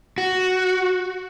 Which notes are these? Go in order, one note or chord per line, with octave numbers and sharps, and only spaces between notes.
F#4